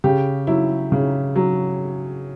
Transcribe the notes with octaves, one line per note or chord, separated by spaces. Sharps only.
C#3 G4
F#3 E4
C#3
F#3